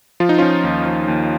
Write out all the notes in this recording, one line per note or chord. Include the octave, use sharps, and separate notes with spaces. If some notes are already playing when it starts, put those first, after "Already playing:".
F3 F4
D#4
F3 C#4 F4
D#2
F3
D#2